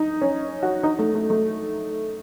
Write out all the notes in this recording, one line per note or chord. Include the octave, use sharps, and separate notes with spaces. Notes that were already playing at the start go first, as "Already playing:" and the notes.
Already playing: D#4
C#4
F#4
D#4
A3
A3
A3